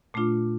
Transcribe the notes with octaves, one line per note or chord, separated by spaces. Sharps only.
A#2 A3 D4 F4